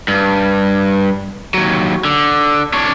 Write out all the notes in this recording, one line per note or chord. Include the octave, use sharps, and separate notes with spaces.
G2
D#2 F#3
D3
D4 C#5